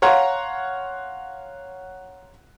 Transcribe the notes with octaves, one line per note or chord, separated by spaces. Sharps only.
C#5 F5 F#5 A#5 C6 C#6